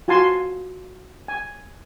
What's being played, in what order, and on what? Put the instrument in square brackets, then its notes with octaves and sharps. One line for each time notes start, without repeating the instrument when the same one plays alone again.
[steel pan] F4 F#4 G#5 A5 C6
G#5